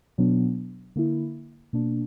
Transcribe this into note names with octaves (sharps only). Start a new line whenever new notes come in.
B2 F#3 B3 D4
D3 A#3 E4
B2 A#3 D4